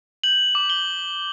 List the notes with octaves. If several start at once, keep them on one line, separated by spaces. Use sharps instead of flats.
G6 F#7
D6
G7